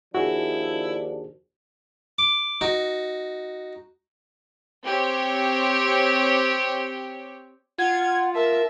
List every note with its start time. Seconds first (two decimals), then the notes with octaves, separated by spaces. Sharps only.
0.15 D#2 F3 D4 E4 F#4 G#4
2.18 D6
2.61 D#4 F#4
4.86 C4 G4 C#5
7.78 F4 F#5 G#6
8.35 A#4 E5 A5